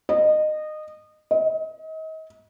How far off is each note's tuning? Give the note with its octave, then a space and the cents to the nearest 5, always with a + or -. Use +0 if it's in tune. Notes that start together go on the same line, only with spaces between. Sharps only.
D#5 -20
D#5 +35